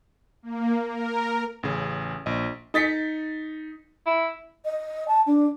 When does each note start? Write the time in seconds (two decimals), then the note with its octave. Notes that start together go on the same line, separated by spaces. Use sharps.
0.43 A#3
0.86 A#4
1.63 A1 C#3 G#4
2.26 A#1 D#5
2.74 D#4 A6 B6 C#7
4.06 E4
4.65 D#5
5.08 A5
5.27 D4